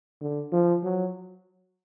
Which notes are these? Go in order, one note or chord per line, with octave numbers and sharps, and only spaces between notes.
D3
F3
F#3